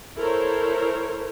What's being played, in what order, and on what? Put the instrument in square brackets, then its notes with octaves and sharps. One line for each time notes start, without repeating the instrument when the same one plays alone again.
[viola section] E4 A4 A#4 C5 C#5